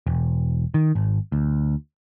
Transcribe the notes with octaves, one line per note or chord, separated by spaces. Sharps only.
E1
D#3
G#1
D2